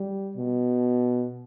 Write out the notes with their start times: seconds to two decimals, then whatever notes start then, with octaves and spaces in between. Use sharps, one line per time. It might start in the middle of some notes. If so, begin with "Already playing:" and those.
Already playing: G3
0.36 B2